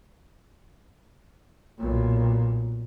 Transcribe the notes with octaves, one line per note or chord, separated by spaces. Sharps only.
B1 A#2